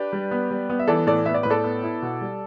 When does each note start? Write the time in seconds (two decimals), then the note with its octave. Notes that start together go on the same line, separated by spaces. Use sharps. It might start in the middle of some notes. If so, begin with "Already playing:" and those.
Already playing: D4 G4 B4
0.13 G3
0.31 B3
0.51 G3
0.70 B3
0.79 E5
0.88 E3 A4 D5
1.07 A2 A4 D5
1.26 B3 E5
1.34 D5
1.43 A2 B4
1.50 A4 D5
1.64 B3
1.83 E4
2.02 B2
2.21 G3